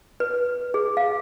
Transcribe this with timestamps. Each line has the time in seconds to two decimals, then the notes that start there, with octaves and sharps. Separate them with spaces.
0.20 B4
0.74 G#4
0.97 F5